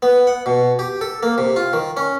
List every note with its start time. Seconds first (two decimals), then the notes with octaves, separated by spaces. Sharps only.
0.02 B3
0.27 F#5
0.46 B2
0.79 G4
1.01 A4
1.23 A#3
1.38 C3
1.56 F4
1.73 D#3
1.97 C#4